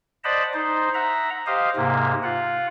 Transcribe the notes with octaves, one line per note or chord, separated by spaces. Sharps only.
C5 D5 D#5 F#5 A5 B5
D#4 C5
E5 F#5 A#5
G4 C5 D#5 F5
G#2 C3 A#3
F4 F#5